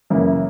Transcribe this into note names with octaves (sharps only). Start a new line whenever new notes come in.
F#2 C#3 E3 A#3 E4